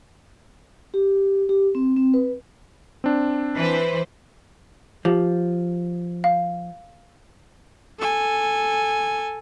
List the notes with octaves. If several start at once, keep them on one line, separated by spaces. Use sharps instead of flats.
G4
G4
C4
C4
B4
C4 D4
E3 B4 C5
F3 G4
F5
A4 G#5